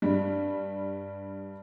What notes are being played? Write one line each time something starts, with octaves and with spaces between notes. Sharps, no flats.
G2 G3